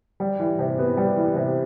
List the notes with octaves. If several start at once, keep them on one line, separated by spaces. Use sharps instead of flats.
G3
E3
C3
B3
G3
E3
C3